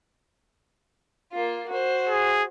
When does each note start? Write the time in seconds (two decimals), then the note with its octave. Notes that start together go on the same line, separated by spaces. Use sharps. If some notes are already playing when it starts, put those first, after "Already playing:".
1.32 A#3 F4
1.69 F#4 C5
2.09 G#4